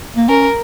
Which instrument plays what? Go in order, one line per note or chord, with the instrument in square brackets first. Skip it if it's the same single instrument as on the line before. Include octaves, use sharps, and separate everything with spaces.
[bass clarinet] A#3
[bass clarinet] C#4 [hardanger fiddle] A#4